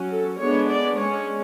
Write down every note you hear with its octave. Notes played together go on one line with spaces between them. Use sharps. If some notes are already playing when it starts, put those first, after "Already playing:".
Already playing: F#3 C#4
A4
G#3 B3 D4 C#5
D5
G#3 C#4 C#5